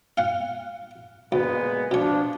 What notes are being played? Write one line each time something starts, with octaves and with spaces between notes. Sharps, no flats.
F5 F#5
D2 A#2 G#3 B3
B2 F3 D4 C#5